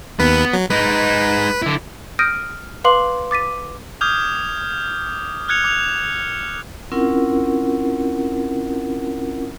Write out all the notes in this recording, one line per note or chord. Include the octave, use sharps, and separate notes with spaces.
D#2 B3 B4
F#3
G#3 D#4 B4
D3 E4
D#6 F6 G6 A#6 D7 D#7
B4 F5 C6 D6 F#7
D6 A6 B6 D#7
D6 D#6 F6 G6 G#6
F6 F#6 G#6 C#7 F7
D6 F7
C4 C#4 E4 F4 A#4 F#5